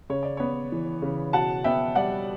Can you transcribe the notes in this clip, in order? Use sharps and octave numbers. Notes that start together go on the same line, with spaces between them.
C#3 C#5
D5
B3 C#5
E3
C#3
B2 F#5 A5
B3 E5 G5
G3 D5 F#5